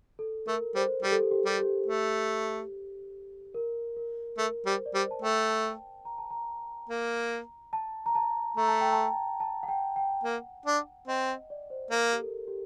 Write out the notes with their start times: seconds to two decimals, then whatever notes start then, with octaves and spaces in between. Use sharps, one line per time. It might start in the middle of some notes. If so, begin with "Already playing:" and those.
0.19 A4
0.47 A3 A#4
0.75 G3 C5
1.03 G3 G4
1.12 A4
1.21 G4
1.31 G4
1.46 G3
1.59 G4
1.87 A3
3.54 A#4
3.97 A#4
4.38 A3 A#4
4.66 G3 C5
4.86 D5
4.94 G3 C5
5.11 A5
5.22 A3 G5
5.49 A5
6.05 A#5
6.18 A5
6.30 A#5
6.89 A#3
7.73 A5
8.06 A#5
8.15 A5
8.57 A3 A#5
8.68 A5
8.81 G5
8.93 A5
9.40 A5
9.63 F#5
9.68 G5
9.96 G5
10.24 A#3 F#5
10.66 D4
11.08 C4 D#5
11.50 D5
11.70 C5
11.91 A#3 A#4
12.13 G4
12.19 A4
12.48 G4